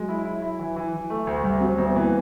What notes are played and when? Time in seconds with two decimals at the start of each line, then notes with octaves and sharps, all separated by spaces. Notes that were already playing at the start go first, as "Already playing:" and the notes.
Already playing: F#3 G#3
0.09 E4
0.25 E4
0.42 E4
0.59 E3
0.76 E3
0.93 E3
1.10 A3
1.27 D2
1.44 D2 G3
1.61 F#3 C4
1.78 D2 B3
1.95 E3 A#3